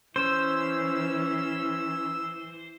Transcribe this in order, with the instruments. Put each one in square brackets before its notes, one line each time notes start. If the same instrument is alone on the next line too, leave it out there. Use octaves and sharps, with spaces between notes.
[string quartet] E3 [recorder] C#4 [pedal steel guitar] C5 [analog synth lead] E6